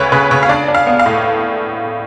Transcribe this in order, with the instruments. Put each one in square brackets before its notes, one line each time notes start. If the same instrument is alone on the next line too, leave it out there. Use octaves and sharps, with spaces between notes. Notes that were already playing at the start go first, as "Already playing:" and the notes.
Already playing: [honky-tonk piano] D2 C#3 B4 C#5
C#3 B4
C#3 C#5
F5
D4 D5
D4
F5
B3
F5
A2